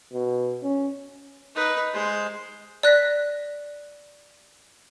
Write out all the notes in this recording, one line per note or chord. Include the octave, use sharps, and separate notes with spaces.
B2
C#4
D#4 B4
G#3 C5
D5 F#6 A#6 B6